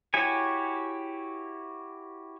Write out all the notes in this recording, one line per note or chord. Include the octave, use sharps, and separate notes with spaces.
E4 F#4 G4 C#5 G#5